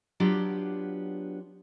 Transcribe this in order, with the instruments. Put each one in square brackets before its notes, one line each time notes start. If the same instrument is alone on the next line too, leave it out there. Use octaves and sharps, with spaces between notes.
[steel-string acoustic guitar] F#3 B3 D4 F4 G4